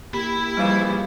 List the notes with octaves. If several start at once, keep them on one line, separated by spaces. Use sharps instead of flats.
A#3 E4 G4 B5
C#3 E3 F3 G3